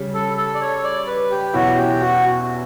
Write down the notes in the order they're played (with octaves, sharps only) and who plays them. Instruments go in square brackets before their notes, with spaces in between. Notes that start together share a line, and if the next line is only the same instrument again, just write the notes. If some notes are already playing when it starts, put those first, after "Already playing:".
Already playing: [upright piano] C#3 G3 C#4
[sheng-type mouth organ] A4
A4
D5
C#5
D5
B4
G4
[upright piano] E2 B2 F#3 C#4 E4 [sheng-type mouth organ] F#4
[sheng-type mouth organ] G4
F#4